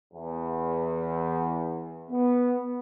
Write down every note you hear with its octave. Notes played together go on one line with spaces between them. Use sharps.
E2
B3